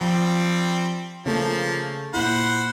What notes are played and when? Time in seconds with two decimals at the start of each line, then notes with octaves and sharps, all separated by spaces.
0.01 F3 G3 C4
1.26 C#3 F3 A3 A#3
2.14 A#2 E4 C5 F#5 B5